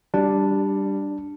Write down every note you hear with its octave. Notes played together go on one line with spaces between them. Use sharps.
G3 D4